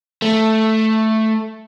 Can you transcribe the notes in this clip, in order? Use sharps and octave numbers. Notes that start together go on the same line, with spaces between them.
A3